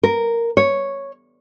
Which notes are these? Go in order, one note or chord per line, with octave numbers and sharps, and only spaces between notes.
A#4
C#5